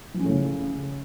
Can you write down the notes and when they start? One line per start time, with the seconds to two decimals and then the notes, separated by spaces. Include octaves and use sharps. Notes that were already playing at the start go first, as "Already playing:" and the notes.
0.14 F3
0.19 C#4
0.24 A2
0.29 C#3